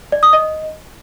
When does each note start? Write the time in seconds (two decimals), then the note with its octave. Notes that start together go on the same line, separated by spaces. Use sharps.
0.12 D5
0.23 D#6
0.33 D#5